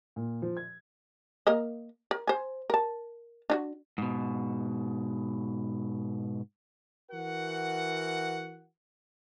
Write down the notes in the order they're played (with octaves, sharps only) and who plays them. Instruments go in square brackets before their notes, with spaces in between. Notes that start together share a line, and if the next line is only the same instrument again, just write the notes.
[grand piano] A#2
F3
G#6
[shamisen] A#3 A#4 D#5
A#4
C5 G#5
A#4 A5
D4 F4 F#4
[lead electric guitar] G#2 B2
[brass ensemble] E3 F#4 A#4 F#5